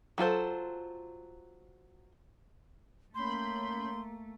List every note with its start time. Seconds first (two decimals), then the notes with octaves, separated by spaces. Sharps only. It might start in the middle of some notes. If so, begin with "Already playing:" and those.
0.18 F#3 F4 A4 C5
3.15 A3 A#3 C#4 B5 C6 G6